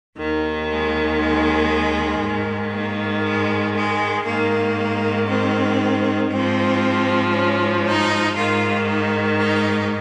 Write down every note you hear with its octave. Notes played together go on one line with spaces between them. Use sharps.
D#2 D#3
G#3
G#3
G#2 D#3
A#3
G#3
G#3
G#2 D#3 A#3
C4
G#2 F3 C4
C#4
D#4
G#2 D#3 F4
D#4
D#4